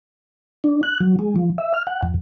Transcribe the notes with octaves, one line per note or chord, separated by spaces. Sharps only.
D4
F#6
F#3
G#3
F3
E5
F6
F#5
F2